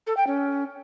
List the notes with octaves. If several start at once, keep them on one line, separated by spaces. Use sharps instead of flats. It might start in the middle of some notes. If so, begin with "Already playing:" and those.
A4
G5
C#4